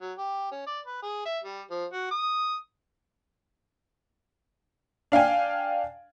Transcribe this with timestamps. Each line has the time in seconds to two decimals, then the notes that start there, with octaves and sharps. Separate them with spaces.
0.01 F#3
0.18 G4
0.52 C#4
0.67 D5
0.86 B4
1.03 G#4
1.26 E5
1.44 G3
1.71 F3
1.93 F#4
2.11 D#6
5.12 D4 F5 G5 G#5